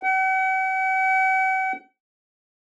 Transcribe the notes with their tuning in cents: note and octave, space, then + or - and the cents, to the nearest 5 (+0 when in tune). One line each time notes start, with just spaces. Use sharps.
F#5 +45